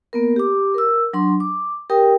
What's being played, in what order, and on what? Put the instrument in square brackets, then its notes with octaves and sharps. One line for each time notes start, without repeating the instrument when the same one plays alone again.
[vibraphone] A#3 B3 A#4
G4 D6
A#4 E6
F#3 D4 C6
D6
G4 A#4 G5 D#6